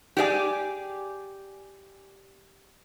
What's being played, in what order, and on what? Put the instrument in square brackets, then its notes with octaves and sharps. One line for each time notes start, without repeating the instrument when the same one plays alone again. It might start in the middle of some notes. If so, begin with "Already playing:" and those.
[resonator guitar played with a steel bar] G4 G#4 D5 D#5 G#5